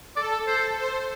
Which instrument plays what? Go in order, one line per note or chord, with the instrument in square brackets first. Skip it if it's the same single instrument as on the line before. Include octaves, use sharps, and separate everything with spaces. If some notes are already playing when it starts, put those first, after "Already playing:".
[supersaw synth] A4 [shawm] D5
[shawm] A4
[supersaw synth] A4 [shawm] C5
[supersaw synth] C5